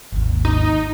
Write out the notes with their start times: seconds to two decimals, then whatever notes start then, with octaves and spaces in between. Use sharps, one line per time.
0.12 G#1 D#2
0.45 D#4